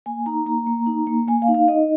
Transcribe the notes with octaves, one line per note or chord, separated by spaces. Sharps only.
A#3 G#5
D#4 A#5
A#3 A#5
A#3
D#4
A#3
A#3 G#5
F5
D#4
F5
D#4 D#5